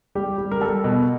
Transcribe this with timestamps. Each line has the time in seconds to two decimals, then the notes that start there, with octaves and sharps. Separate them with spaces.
0.15 G3 G4
0.38 G3
0.51 A#4
0.61 G3 A4
0.84 B2